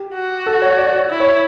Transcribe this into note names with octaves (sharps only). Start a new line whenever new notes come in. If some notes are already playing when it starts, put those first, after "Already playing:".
Already playing: G4
F#4
A4
C#5
D5
C#5
E4
C#5